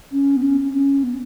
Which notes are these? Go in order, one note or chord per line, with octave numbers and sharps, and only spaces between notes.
C#4
B3
C#4
C#4
B3